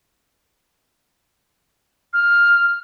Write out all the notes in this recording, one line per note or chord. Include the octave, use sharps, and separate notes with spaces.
F6